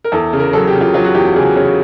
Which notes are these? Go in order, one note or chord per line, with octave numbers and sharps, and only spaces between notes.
A#4
E2 A4
C#3
A#4
F#3 A4
G4
C#3
F4
F#3 F4
F#4
E2 G4
G4
C#3 G#4
C#3 C#5